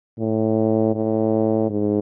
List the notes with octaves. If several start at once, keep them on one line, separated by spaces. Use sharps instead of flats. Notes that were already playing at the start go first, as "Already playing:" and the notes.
A2
A2
G#2